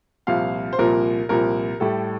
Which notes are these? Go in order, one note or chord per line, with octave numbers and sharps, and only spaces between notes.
C2 A#2 F3 F5
C5
C2 A#2 F3 A#4
C2 A#2 F3 A#4
A2 G3 A4